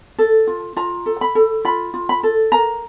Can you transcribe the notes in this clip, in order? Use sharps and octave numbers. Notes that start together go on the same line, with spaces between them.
A4
F4
F4 A#5
A4
B5
A4
F4 B5
F4
B5
A4
A#4 A#5